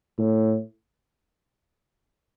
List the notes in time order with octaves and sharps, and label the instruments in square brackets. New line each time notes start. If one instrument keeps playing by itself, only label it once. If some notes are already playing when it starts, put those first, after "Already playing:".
[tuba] A2